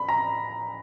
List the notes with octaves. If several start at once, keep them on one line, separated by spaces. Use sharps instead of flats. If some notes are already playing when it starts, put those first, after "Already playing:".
Already playing: B5
A#5